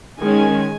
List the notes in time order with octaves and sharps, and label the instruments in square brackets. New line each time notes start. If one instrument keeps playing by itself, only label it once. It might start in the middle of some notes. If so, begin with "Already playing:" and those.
[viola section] D#3 G#3 C#4 G#5